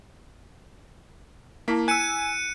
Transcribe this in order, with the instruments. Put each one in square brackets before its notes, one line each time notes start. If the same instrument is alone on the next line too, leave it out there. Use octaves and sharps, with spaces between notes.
[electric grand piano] A#3 B6 [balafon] E4 A5
[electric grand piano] G#5 E6 [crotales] F#6 C#7 D#7